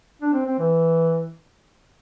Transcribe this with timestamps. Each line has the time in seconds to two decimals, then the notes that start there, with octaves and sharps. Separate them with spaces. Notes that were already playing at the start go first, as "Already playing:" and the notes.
0.22 D4
0.33 C4
0.47 C4
0.59 E3